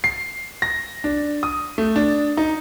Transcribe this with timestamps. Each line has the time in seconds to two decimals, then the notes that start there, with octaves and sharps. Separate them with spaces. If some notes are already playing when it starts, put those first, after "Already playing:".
0.04 C7
0.62 A#6
1.04 D4
1.43 D#6
1.78 A3
1.96 D4
2.37 D#4